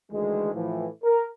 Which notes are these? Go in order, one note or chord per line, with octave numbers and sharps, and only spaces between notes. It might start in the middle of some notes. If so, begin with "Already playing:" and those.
D2 D#3 E3 G#3
A2 E3 F3
A#4